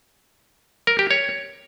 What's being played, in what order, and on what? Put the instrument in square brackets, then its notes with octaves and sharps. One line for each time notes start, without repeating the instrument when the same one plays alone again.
[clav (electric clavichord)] A#4
G4
C#5